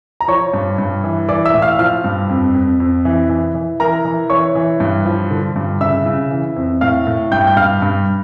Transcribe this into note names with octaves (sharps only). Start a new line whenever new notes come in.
A#5
F3 C#5 C#6
G2
G2
E3
E3 D5 D6
E5 E6
A2
F5 F6
F3 F5 F6
G2
F2
F2
F2
E3
E3
E3
E3 A#4 A#5
E3
E3 C#5 C#6
E3
G2
F3
D3
G2
C#3 E5 E6
C#3
E3
F2
A2 F5 F6
A2
G2 G5 G6
G6
G2 F5 F6
G2